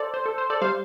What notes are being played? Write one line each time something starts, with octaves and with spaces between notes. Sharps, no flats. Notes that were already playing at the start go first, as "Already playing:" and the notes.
Already playing: A4 C5 D5
C5
A4
C5
A4 D5
G3 C5 F5